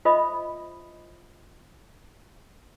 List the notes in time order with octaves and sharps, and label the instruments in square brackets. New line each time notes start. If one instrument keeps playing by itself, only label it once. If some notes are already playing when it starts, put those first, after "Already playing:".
[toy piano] F4 C5 D#5 E5 B5 D#6